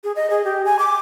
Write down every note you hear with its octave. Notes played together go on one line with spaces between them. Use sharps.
G#4
D#5
G#4
G4
G#5
D6